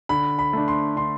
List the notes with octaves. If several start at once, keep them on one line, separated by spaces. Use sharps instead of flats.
D3 B5
B5
A3 D4
C6
D3 C6